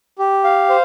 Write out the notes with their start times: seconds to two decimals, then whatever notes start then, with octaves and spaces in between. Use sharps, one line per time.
0.19 G4
0.44 F5
0.69 C5